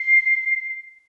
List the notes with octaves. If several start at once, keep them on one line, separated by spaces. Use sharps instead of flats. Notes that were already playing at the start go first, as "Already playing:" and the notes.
Already playing: C7